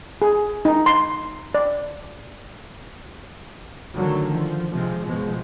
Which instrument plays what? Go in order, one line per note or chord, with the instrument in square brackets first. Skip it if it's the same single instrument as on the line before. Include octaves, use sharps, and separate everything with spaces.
[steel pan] G#4
D#4
C6
D5
[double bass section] D3 D#3 F#3 A3
F3
C3 F3 G#3
F#1 B2 F3 G#3